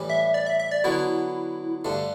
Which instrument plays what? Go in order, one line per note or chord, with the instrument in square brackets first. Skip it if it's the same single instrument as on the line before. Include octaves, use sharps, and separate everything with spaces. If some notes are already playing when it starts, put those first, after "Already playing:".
Already playing: [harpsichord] A2 E3 G3
[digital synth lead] E5
D5
E5
E5
D5
[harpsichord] D3 F#3 B3 F#4 [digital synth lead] E4
[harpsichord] G2 D3 A3